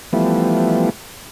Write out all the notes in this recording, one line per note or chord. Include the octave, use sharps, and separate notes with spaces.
E3 F3 G3 A3 B3